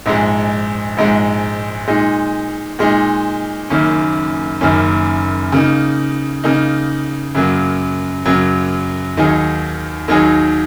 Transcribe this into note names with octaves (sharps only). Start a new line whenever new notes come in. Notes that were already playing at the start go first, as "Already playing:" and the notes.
A#1 G#2 G#3
A#1 G#2 G#3
A#2 G#3 D#4
A#2 G#3 D#4
F#1 F#2 D#3 A#3 C#4
F#1 F#2 D#3 A#3 C#4
C#3 A#3 D#4
C#3 A#3 D#4
F#2 C#3 F#3 A#3
F#2 C#3 F#3 A#3
D#2 D#3 F#3 D#4 G#4
D#2 D#3 F#3 D#4 G#4